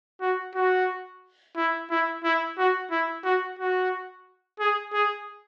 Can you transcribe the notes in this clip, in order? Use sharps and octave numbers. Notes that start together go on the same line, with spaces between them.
F#4
F#4
E4
E4
E4
F#4
E4
F#4
F#4
G#4
G#4